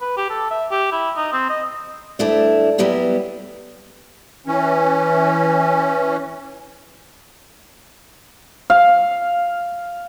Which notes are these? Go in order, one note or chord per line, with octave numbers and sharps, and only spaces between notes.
B4
G4
A4
E5
G4
E4
D#4
C4
D#5
D2 G2 A3 E4 D5
F#3 G3 B3 E4 G4
E3 C#4
F5